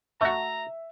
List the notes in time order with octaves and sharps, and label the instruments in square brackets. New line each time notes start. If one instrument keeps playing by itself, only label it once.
[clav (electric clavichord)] A3 F#4 [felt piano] E5 [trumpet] A#5